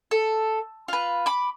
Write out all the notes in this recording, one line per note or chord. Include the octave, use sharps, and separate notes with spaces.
A4
F4 B4
B5 D6